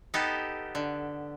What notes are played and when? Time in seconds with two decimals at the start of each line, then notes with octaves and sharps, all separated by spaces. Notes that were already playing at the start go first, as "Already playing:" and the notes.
0.14 B3 D#4 G4 A4
0.75 D3